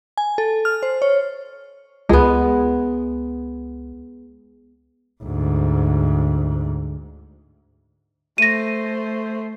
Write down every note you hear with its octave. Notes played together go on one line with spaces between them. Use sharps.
G#5
A4
F6
C5
C#5
C#2 G#3 B3
D2 G#2
A3 C5 A#6 D#7